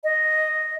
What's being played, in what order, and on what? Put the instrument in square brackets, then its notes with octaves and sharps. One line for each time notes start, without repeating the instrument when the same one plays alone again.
[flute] D#5